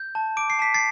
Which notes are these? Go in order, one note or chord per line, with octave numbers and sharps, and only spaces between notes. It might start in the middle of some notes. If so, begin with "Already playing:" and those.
Already playing: G6
A5
D6 D7
C7
A5 B6
A6 C7